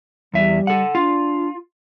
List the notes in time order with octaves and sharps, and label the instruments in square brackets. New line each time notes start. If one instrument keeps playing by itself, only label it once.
[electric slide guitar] E2 E5 [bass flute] G3
[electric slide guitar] A4 F#5
[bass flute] D4 [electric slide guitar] F4